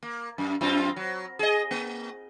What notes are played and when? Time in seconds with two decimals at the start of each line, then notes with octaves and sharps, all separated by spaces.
0.03 A#3
0.38 F#2
0.61 F#2 C4 F4
0.96 F#3
1.39 G#4 D#5
1.71 A#3